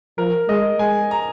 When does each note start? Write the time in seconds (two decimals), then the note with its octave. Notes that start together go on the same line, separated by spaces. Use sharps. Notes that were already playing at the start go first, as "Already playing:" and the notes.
0.18 F3 A#4
0.49 G#3 D#5
0.79 G#3 G#5
1.11 A#5